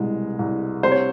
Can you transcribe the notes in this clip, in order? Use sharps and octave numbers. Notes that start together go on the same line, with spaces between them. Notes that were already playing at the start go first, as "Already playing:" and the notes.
Already playing: C2 B2 G#3
C2
C3 C5
C#5